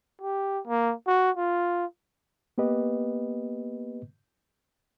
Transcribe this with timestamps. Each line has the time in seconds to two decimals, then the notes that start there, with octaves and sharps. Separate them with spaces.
0.21 G4
0.67 A#3
1.07 F#4
1.36 F4
2.58 A#3 B3 G4 B4 D#5